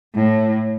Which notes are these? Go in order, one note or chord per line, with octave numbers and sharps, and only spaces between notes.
A2